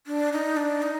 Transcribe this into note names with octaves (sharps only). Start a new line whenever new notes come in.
D4
D#4
D4
D#4